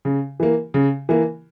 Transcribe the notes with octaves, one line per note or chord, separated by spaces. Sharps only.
C#3
E3 A#3
C#3
E3 A#3